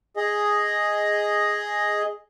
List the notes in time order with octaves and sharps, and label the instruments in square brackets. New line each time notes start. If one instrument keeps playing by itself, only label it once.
[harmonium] G#4 D#5